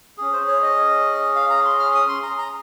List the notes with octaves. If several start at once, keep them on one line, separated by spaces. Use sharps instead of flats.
C#4 G#4
C5
C#5
D#5
F5
A#5
C6
F6
D#6
C6
A#5
A#5